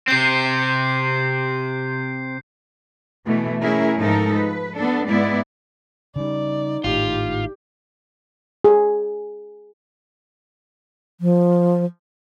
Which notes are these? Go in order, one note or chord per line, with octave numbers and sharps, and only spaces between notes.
C3 C4 G6 C7
B2 E3 A3
A3 C#4 E4 G#4 A#4
G#2 F3 D#4 A4 A#4
B4
B3 D4 A4
G#2 G#3 B3 E4 D5
C#3 G3 D#4 D5
G#1 A2 F4 G4
G#4
F3